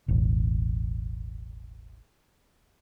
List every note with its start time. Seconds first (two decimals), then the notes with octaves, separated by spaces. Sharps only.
0.08 E1 A1